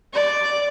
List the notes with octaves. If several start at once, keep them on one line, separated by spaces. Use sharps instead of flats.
D5